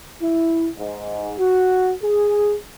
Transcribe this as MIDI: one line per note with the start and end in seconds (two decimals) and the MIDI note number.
0.21 0.67 64
0.78 1.32 44
1.39 1.93 66
2.03 2.54 68